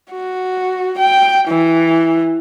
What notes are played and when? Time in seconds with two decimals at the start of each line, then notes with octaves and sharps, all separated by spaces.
0.12 F#4
0.98 G5
1.49 E3